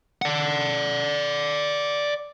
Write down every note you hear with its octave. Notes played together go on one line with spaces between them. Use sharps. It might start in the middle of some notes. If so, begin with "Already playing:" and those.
D5 F#5